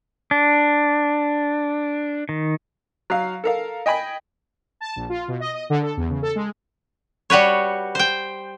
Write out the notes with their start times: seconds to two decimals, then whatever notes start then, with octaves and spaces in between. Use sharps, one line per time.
0.31 D4
2.29 D#3
3.10 F#3 F5
3.44 A4 A#4 F5
3.86 D#5 G5 G#5 B5
4.81 A5
4.96 A#1
5.09 F4
5.28 B2
5.40 D#5
5.54 D#5
5.70 D3
5.82 A4
5.97 E2
6.10 C#3
6.23 A4
6.36 G#3
7.30 G3 F#4 B4 C#5
7.95 C5 G5